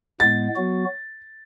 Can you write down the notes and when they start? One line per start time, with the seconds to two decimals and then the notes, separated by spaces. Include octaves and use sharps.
0.20 A2 G#3 B3 A6
0.56 F#3 B3 F#4